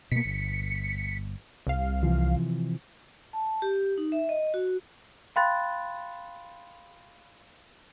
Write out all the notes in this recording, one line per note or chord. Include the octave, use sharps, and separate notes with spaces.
B2 A#3 B6 C#7
G1
C2 F5
C3 E3 F3
A5
G4
D#4
E5
D#5
F#4
F5 G5 B5 C6 F#6 A6